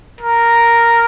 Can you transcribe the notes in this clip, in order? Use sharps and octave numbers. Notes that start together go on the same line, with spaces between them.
A#4